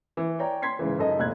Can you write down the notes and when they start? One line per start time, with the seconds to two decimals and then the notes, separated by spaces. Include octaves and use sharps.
0.17 E3
0.39 C#5 D5 G5 A#5
0.62 C6 G#6 B6 C7
0.79 G#2 C#3 E3
0.98 F#2 C#3 D#4 A4 D#5
1.19 F1 A#2 F#6 G#6